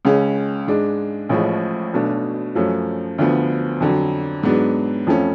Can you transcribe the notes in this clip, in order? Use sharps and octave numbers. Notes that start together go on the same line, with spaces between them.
C#2 C#3 G#3 C#4
G#2 G#3 D4
A1 A2 F3 G#3
B1 B2 A3 D4
F#2 F3 A3 C#4
D2 D3 F3 B3
F2 D3 F#3
G#2 F#3 B3 D4
F2 F3 A3 C#4